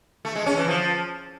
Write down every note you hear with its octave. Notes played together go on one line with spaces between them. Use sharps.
A3
G#3
C#4
E3
F3